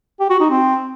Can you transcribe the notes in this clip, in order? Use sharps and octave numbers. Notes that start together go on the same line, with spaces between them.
G4
F#4
D#4
C4